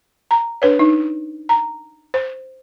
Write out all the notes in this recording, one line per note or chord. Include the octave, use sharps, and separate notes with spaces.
A#5
D4 B4 C#5
D#4
A#5
C5